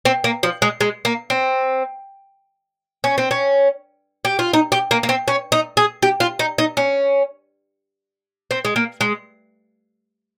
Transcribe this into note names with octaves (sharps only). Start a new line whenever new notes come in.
C4
A#3
F3
G#3
G#3
A#3
C4
C#4
C4
C#4
G4
F4
D#4
G4
A#3
A#3
C4
C#4
D#4
G#4
G4
F4
D#4
D#4
C#4
C4
G#3
A#3
G#3